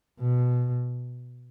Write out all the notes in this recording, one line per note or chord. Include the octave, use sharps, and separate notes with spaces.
B2